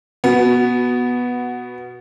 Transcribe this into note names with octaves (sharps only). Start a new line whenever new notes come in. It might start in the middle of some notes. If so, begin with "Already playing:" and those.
B2 B3